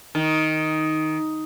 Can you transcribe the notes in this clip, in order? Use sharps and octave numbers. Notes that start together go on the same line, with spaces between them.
D#3